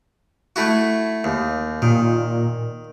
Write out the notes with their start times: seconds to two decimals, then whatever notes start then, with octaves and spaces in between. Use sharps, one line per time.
0.56 A3 E4 F#4
1.24 D#2
1.82 A#2 D#3